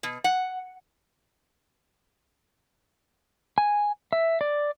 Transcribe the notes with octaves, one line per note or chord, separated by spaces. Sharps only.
B2
F#5
G#5
E5
D5